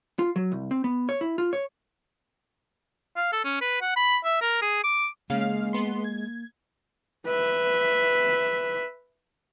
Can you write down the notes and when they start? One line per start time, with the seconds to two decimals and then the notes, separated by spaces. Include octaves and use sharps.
0.19 F4
0.36 F#3
0.52 C2
0.71 C4
0.84 B3
1.09 C#5
1.21 E4
1.38 F4
1.53 C#5
3.17 F5
3.33 A4
3.44 C#4
3.61 B4
3.81 F#5
3.96 B5
4.25 E5
4.41 A#4
4.62 G#4
4.84 D6
5.30 C#3 G#3 A#3 F5
5.73 B3 C6
6.04 G#6
7.26 B4 E5